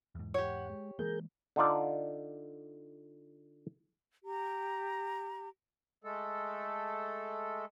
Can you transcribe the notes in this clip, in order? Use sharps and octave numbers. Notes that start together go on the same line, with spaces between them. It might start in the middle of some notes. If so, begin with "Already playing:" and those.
E2 G#2
G4 C#5 F#5
G#3
E3 G#3 A#3 G#4 A#4 G6
D3 D#4 F4 D5
G4 A#5
G#3 A3 A4